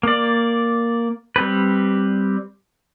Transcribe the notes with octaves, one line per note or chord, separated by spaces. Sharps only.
A#3 D5
G3 C4 B4